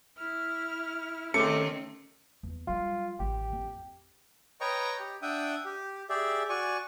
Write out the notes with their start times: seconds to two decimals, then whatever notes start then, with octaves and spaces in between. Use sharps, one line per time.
0.17 E4 F6
1.34 C3 D#3 A3 C4 C#4 D6 C#7
2.43 E2
2.67 F#3 G3 F4
3.19 A1 D#3 G4
3.53 F2
4.61 B4 C#5 D#5 G5 A#5 C#6
5.00 G4
5.22 D4 E5 F#5 G5 D#6
5.65 G4
6.09 G4 G#4 D5 E5
6.49 F#4 D5 G#5 C#6